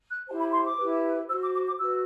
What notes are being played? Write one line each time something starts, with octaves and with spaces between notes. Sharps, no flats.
F#6
E4 G4 C5 A5
B5
C6
D6
E4 G4 B4
F#4 C5 E6
D6
D6
D6
F#4 B4 E6